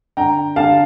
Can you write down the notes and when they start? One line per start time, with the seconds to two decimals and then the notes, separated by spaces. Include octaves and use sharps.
0.17 D3 G5 A#5
0.56 D3 F5 A5